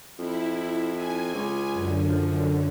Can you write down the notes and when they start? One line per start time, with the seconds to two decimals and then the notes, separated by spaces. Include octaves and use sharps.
0.19 F2 E4
0.95 G#5
1.34 C#2
1.73 F#2 D3
2.09 F3